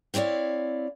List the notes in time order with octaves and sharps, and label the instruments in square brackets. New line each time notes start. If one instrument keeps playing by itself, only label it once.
[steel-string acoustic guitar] C4 E4 C#5 D5 F5